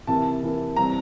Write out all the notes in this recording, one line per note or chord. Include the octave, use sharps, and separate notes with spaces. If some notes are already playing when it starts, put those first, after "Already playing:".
C3 E3 A#3 A5
C3 E3 A#3
E3 G3 C4 A#5